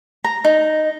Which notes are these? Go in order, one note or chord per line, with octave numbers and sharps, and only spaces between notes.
A#5
D#4